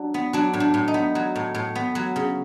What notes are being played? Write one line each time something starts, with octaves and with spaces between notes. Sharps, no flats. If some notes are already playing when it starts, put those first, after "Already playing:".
Already playing: F#3 D4
B3
F#3 D4
A2
D4
A2
D#4
B3
F#3
A2
A2
B3
F#3
C#3